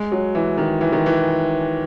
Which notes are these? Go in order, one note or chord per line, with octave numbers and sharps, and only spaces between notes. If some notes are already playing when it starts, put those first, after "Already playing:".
Already playing: G#3
F#3
E3
D#3
E3
D#3
E3